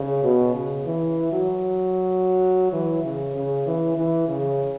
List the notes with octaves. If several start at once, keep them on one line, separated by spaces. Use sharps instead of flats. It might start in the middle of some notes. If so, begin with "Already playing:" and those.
Already playing: C#3
B2
C#3
E3
F#3
E3
C#3
C#3
E3
E3
C#3